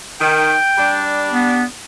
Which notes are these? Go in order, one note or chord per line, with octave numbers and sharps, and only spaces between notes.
D#3 G5
G3 D4
B3